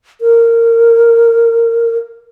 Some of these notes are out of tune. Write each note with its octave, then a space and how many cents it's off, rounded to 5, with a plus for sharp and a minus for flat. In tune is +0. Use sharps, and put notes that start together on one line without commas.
A#4 -15